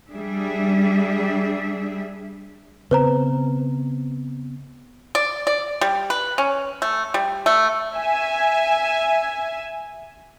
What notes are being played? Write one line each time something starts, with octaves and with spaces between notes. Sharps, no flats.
G3 D4 G#4 E5
C#3 B3 C4 B4 C5 A#5
D5
D5
G3
B4
C#4
A3
G3
A3
E5 G#5